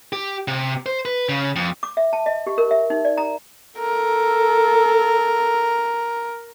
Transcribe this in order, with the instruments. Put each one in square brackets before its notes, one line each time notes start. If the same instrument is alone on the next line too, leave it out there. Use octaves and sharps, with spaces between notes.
[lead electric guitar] G4
C3
C5
B4
C#3
F2
[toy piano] D6
E5
A5
D#5
G4
A#4
E5
D#4
D5
A#5
[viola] A4 [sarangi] A#4